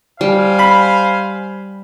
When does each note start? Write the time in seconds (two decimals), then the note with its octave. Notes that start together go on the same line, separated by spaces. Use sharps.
0.21 G3 C5 F5 G#5
0.59 B5